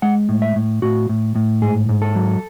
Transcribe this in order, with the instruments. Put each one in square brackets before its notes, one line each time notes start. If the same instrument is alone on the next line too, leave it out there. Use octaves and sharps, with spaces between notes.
[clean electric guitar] G#3 F#5
A2
E5
A2
A2 F#4
A2
A2
G#2 G#4
G#2
A4
F#3